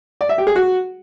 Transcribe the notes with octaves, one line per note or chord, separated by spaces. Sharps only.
D5
E5
G4
G#4
F#4